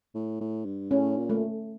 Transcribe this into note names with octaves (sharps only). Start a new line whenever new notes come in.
A2
A2
G2
A2 C#4
A#2
A3